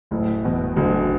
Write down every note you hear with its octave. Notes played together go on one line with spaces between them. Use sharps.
F#1 A2
E2 B2
F#1 D2 D3